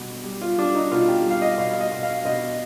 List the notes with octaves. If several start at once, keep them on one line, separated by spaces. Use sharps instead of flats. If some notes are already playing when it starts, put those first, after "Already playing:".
Already playing: B2 G3
G3
F4
G3 D4
D#4
B2 F4
G4
G3 F5
D#5
B2 F5
D#5
B2
F5
B2 D#5